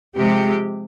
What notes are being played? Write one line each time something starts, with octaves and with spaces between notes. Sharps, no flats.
C3 F3 G#3 G4